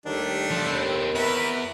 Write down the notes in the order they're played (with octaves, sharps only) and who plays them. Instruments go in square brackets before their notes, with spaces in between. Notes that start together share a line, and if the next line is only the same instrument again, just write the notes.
[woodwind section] D#2 D#3 [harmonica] G3 A3 D4
[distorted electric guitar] C#3 F3
[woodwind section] D#2 [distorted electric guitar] B3 C4
[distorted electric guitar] E2 [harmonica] A#4 B4 E5